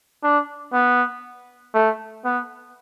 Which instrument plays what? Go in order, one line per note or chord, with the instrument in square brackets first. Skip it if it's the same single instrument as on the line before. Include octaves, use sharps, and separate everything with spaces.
[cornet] D4
B3
A3
B3